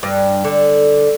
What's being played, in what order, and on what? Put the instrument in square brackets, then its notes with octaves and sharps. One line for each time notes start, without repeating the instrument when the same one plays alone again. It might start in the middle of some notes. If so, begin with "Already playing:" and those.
[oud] G2
D3